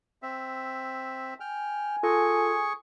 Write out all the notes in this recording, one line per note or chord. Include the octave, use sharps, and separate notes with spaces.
C4 E5
G5 G#5 F6
F4 G#4 A4 C#6